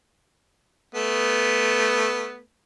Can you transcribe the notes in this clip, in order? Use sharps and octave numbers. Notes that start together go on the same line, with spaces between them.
A3 B3